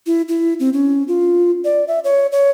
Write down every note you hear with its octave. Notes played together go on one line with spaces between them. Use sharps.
E4
E4
C4
C#4
F4
D5
E5
C#5
C#5